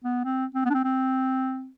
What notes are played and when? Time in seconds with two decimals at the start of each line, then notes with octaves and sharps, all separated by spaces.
0.04 B3
0.24 C4
0.55 C4
0.65 B3
0.70 D4
0.74 C4
0.85 C4